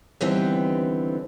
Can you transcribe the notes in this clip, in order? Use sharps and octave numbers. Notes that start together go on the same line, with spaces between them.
D#2 D3 E3 G3 B3 C4